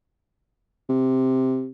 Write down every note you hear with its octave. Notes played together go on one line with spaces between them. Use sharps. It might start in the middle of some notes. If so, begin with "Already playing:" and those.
C3